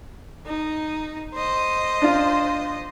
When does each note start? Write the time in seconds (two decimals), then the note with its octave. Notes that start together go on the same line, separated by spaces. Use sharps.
0.46 D#4
1.35 C5 D#5
2.02 D4 F4